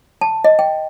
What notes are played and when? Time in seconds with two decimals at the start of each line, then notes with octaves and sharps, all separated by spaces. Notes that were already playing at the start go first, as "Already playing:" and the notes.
0.21 A5
0.44 D#5
0.59 G5